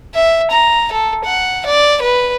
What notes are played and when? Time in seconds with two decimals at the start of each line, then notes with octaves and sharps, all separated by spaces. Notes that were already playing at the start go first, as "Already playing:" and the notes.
0.14 E5
0.51 A#5
0.92 A4
1.24 F#5
1.66 D5
2.02 B4